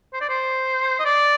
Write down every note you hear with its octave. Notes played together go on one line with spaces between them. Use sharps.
C5
D5
C5
D#5
D5